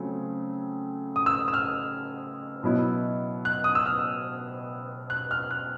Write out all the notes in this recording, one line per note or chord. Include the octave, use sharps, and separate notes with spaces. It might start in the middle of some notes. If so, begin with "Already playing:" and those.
Already playing: C#3 F#3 A3 C4
D#6
E6
E6
F6
B2 F#3 B3 E4
F#6
D#6
E6
F6
F#6
F6
F#6